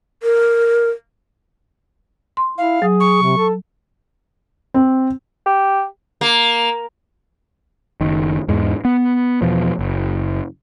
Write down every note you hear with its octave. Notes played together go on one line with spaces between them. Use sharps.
A#4
C6
E4 F5
F#3 G#4
C#6
C3
A4
C4
G4
A#3
F#1 D#3
E2 G#2 G#3
B3
E2 B2 F3
F#1